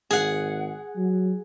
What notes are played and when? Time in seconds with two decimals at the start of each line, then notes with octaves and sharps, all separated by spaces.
0.11 G#1 G#4 F#5
0.96 F#3